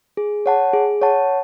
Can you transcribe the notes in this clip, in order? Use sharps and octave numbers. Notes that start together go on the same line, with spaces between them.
G#4
C#5 F#5 A5
G#4
C#5 F#5 A5